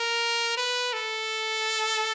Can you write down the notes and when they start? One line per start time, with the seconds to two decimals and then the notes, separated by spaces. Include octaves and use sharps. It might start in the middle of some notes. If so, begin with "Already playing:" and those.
Already playing: A#4
0.57 B4
0.93 A4